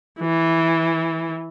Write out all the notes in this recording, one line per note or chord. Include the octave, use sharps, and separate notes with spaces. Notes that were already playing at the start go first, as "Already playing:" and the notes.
E3